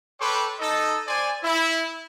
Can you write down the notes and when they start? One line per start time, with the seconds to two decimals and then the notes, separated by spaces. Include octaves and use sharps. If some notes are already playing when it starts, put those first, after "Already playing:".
0.20 A4 B4 C#5 G5 C6 D6
0.59 D#4 A4 D#5
1.08 C5 D5 G#5
1.44 E4